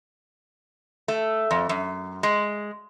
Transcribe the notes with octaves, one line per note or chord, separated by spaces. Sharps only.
A3
F2
F#2
G#3